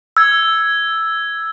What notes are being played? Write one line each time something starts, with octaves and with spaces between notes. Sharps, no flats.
E6 G#6